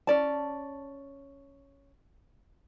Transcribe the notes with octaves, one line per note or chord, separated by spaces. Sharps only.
C#4 D5 A5